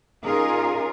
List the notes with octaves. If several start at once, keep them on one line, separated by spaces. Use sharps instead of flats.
C#4 D#4 F4 G#4 A#4